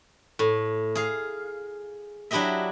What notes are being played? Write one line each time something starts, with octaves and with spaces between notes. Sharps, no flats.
A2
G#4 F5
F#3 D4 E4 G4 D#5 E5